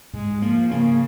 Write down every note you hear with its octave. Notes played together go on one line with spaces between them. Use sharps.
G#2 G#3
F3 A#3
C#3 A#3